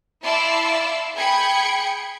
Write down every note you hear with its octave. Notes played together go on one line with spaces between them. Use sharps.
E4 D5 F5 A5 C6 E6
G#4 G5 B5 G#6 C#7